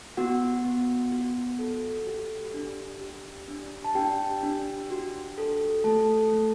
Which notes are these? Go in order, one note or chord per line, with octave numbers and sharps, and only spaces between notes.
B3 F#4 F#5
B3
F#4
A4
G4
D4
G4
D4
A5
D4 G4 G5
D4
F#4
A4
A3 A4 A5
A3